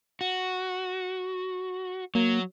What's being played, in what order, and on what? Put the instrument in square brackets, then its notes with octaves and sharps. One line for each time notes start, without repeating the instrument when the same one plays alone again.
[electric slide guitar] F#4
[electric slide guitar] F#3 [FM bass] A#3